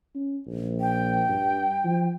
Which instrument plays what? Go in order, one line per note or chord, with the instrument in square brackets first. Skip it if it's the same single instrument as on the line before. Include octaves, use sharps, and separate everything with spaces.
[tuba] C#4
A#1
[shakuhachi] G5
[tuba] G2
F3